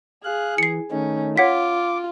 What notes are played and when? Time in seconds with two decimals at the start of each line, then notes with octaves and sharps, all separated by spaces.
0.24 G#4 F5 F#6
0.58 E3 C7 C#7
0.91 D#3 A3 C#4 D#4
1.37 F4 C#5 F#5 D6 B6